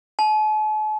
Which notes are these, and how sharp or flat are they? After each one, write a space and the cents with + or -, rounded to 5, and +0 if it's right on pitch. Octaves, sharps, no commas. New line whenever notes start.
A5 -45